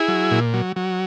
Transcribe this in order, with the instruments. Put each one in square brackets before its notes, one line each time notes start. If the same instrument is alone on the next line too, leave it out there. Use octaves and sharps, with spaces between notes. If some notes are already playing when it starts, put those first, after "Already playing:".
Already playing: [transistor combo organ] E4 G#4
F#3
A#2
F#3
F#3